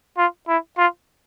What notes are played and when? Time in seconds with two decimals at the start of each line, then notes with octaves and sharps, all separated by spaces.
0.17 F4
0.48 E4
0.78 F4